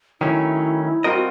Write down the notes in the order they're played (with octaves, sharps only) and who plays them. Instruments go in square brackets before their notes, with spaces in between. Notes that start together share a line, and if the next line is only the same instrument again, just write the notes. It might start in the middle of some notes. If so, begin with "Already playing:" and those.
[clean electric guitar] D#3 F#3 A3 C#4 [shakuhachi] E4
[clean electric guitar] G3 C4 F4 A#4 D#5 [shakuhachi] F#4